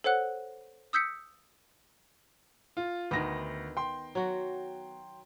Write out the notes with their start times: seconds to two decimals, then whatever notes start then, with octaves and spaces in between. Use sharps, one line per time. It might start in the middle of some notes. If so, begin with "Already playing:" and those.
0.04 A4 C5 C#5 F#5 F#6
0.93 D#6 E6 G6 B6 C#7
2.77 F4
3.11 D2 D#3 B3 A#6
3.77 G5 C6
4.15 F#3 F#4